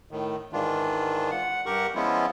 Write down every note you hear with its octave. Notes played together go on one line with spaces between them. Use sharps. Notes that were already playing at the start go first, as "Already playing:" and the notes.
A2 D#3
G#2 D#3 E3 D4 F4
F#5
G2 G4 A#4 F#5 C#6
F3 G#3 B3 C#4 E4 F4